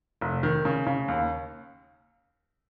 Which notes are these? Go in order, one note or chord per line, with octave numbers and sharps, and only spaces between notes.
F1
D#3
C#3
C#3
D#2